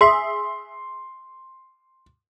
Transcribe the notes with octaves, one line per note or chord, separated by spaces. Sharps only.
G#4 E5 C6